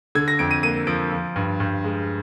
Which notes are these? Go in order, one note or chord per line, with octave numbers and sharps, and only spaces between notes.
D3 G#6
A#6
F2 D7
D#7
A#3 D#7
F3 D7
F3
G2
G2
G#3